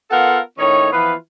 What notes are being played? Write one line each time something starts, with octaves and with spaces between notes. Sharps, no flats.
B3 F4 A4 A#4 F5 F#5
A2 D#3 C#4 D#4 C#5
E3 F3 B3 F4 B4